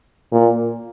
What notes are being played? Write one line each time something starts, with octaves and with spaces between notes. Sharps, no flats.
A#2